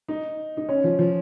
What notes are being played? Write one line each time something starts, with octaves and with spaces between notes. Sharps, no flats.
D#4
D#4
C#4
F3
F3